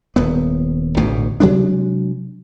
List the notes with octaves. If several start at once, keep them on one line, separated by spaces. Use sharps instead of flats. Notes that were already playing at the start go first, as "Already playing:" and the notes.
D#1 B3
A1 D2 G#2 B2
C3 F#3 G#3 D4